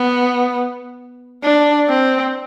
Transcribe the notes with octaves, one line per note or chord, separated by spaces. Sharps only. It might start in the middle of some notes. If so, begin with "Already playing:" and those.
Already playing: B3
D4
C4